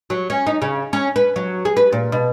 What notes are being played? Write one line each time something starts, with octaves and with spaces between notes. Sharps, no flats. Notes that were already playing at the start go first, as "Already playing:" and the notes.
F#3
C#4
D#4
C#3
C#4
B4
F#3
G#4
B4
A#2
B2